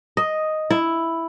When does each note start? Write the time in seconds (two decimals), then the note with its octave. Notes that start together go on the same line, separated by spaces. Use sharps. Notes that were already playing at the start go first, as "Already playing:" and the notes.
0.17 D#5
0.71 E4